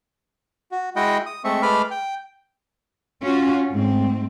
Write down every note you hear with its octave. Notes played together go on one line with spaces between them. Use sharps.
F#4
G#3 E4 F#4 D#5 F#5 G5
D#6
G#3 A3 C4 E5 C#6
G#3 A3 B4 B5 D6 F6
G5
C#4 F4 F#4
G#2 A3 C4